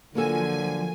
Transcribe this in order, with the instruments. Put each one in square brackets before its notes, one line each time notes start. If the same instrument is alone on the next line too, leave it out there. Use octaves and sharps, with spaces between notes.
[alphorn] D3 [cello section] F3 [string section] F#3 G#5 [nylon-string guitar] A#3 F#4 A4